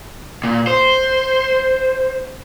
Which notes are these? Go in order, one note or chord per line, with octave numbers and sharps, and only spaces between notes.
A#2
C5